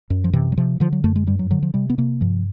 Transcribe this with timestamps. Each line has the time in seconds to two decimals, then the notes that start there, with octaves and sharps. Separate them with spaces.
0.10 F#2
0.24 F3
0.33 C3 E3
0.52 F#3
0.57 C3 F3
0.80 D3 F3
0.93 F#3
1.04 F#2 A3
1.16 G#3
1.27 G2 G3
1.39 F#3
1.51 D3 F#3
1.63 F3
1.74 C3 G3
1.90 B3
1.98 C3 A#3
2.21 G2 F3